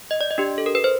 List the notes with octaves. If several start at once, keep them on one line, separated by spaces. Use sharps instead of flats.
D#5
D5
D#5
D4 G4
A4
A#4
B4
C5